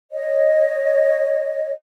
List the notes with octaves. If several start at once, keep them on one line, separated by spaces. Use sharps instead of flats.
C#5 D#5